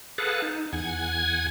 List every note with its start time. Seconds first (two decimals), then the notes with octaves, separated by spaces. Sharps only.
0.18 G#4 A4 B4 F5 F#5 A5
0.42 D#4
0.73 E2 F#5 G#5 G#6